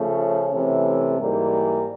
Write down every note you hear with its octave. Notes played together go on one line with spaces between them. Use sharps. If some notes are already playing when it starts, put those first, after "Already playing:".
Already playing: C#3 F3 A3
C#4
C3 E3 A3
G#2 E3 G3 A#3